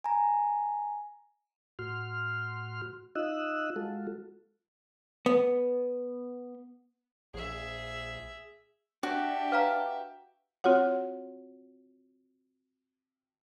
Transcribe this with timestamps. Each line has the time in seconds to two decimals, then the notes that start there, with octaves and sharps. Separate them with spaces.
0.04 G#5 A#5
1.79 A2 F#4 C6 F6
3.15 D#4 F4 D#5 E6 F#6
3.76 G#3 F4 F#4 A4
5.26 B3
7.34 A#1 G#4 E5
9.03 D4 F#4 G4 E5
9.52 B4 F5 A#5
10.64 C4 F4 F#4 C#5 F#5